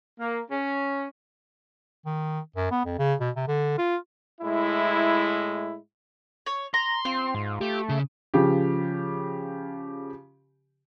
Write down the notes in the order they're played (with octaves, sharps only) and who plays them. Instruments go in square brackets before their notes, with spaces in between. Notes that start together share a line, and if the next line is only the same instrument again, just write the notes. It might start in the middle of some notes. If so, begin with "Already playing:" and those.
[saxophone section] A#3
C#4
[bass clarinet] D#3
F#2
B3
F2
C#3
B2
C3
D3
F4
[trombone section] A2 G#3 E4
[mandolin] C#5
[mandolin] A#5 [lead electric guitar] C6
[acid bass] C4 [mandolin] F4
[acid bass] G#2
[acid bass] A3 [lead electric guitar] G4
[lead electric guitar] C#3
[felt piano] C#3 F3 G4